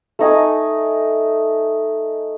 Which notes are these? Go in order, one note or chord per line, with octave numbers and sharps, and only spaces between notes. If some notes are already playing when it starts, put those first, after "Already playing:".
A3 D#4 G#5